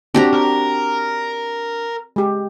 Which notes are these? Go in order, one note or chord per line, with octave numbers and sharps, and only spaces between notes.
C4 D4 F#4 G4 A#5
A#4
G#3 G4